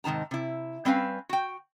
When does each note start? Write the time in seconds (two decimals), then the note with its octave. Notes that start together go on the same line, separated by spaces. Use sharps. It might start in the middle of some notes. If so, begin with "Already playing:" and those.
0.04 G#2 C3 D#3 A5 A#5
0.31 C3 E4
0.85 G3 C4 C#4 B4 F5 G#5
1.29 F#4 G5